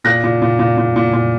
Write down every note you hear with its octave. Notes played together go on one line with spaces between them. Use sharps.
A#2 F#6 A#6
A#2
A#2
A#2
A#2
A#2
A#2